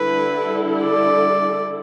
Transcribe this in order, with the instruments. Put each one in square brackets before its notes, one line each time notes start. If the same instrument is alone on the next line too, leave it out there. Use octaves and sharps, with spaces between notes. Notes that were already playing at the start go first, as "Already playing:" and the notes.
Already playing: [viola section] D3 G3 E4 A4 [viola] B4
[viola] D5